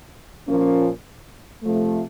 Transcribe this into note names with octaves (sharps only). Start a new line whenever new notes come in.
A#2 F3 A#3 C#4
C3 F3 A3